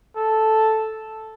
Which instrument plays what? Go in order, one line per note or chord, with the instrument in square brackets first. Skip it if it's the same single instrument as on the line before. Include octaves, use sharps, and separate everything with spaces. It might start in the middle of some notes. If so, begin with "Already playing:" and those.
[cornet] A4